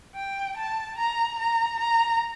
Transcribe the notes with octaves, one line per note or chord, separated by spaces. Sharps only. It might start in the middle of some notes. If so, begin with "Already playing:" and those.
G5
A5
A#5
A#5
A#5